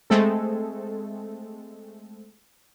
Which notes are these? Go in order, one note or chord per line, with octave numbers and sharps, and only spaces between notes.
G#3 A3 C4 A4